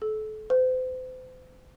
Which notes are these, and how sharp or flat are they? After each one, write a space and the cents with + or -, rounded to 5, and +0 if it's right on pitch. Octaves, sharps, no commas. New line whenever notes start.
A4 -30
C5 -40